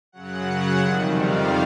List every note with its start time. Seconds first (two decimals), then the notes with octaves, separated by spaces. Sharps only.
0.12 F#2 C#3 F#3 F#5
0.80 F2 C3 D#3 G3
1.13 F5